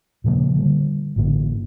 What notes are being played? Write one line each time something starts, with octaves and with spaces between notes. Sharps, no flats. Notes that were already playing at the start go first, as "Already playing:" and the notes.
A#2 C#3 F3 A#3
D3 G3
A1 G2 D3 A#3